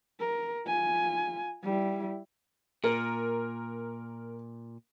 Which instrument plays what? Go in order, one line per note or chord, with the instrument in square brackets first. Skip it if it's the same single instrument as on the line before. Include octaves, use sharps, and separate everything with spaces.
[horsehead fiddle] A#4
F4 G#5
G3 E4
[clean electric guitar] A#2 [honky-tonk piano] A#4